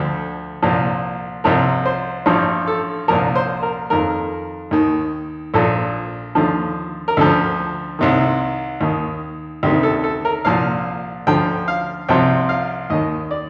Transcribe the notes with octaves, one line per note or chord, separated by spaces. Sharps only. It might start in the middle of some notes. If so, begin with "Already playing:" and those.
Already playing: D2 D3 F3 A4
C2 A#2 F3
C2 C3 F3 A#4
C5
A1 G2 F3
A4
C2 A#2 F3 A#4
C5
A#4
F2 D#3 A#4
D#2 D#3
A#1 A#2 F3 A4
D#2 D3 F3
A#4
D2 D3 F3 A4
C2 C3 D#3
D#2 D#3
D2 C3 D#3 G4
A4
A4
A#4
C2 A#2 F3 F5
D2 D3 F3 G5
F5
C2 C3 F3 G5
F5
D#2 D#3 D#5
D5